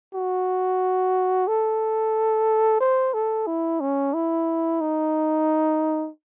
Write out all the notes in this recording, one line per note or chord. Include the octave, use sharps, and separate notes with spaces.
F#4
A4
C5
A4
E4
C#4
E4
D#4